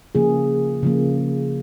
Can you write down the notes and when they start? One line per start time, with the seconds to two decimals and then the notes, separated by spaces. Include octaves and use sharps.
0.15 C#3 F3 A#3 G#4
0.83 C#3 F3 A#3